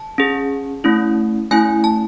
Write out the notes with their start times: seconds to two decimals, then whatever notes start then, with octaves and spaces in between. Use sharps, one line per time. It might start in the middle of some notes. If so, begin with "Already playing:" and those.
Already playing: A5
0.18 C#4 G#4
0.84 A3 C#4 E4
1.51 A3 C#4 E4 G#5
1.84 A5